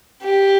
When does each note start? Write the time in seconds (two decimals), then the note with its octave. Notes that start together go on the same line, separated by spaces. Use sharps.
0.22 G4